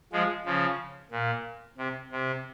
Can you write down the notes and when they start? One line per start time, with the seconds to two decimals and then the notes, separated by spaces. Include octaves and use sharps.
0.12 F3 G#3
0.45 C#3 F3
1.11 A#2
1.78 C3
2.11 C3